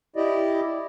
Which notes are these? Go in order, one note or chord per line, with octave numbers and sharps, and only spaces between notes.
E4 G4 D5 D#5